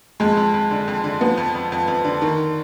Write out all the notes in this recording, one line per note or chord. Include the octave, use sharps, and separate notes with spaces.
F2 G#3
F2
F2
D3
F2
D3
F3 B3
F2
F2
F2
F2
D3
D#3